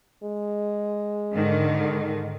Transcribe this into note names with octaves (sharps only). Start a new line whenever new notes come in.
G#3
G#2 D3 D#3